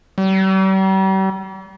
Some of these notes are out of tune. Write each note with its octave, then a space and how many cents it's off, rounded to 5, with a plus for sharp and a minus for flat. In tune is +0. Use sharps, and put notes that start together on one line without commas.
G3 -40